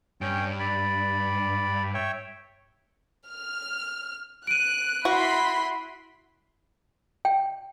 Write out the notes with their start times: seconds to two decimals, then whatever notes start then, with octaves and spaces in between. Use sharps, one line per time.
0.21 G2 C#4 G5
0.60 D5 B5
1.94 C#5 E5 G5
3.28 F6
4.47 F#6 D7 D#7
5.05 E4 F#4 B5 C6
7.25 G5